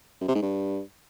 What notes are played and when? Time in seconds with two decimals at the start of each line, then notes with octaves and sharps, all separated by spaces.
0.21 F#2
0.28 C3
0.35 G#2
0.42 G2